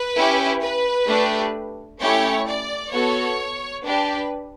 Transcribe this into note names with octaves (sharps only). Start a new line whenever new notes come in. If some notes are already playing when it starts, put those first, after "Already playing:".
Already playing: B4
C#4 E4 G4
B4
A3 D4 G4
A3 C#4 E4 G4 C#5
D5
B3 F#4 A4 C#5
D4 G4 B4